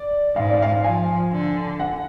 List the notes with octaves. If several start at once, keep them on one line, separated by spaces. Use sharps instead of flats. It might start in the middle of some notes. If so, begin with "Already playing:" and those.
Already playing: D5
G#2 F5
D5
F5
F3 G#5
D3
F#5